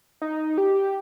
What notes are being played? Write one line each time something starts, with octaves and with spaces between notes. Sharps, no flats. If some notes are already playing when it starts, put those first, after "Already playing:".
D#4
G4